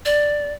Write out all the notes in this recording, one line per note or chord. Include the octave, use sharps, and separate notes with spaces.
D5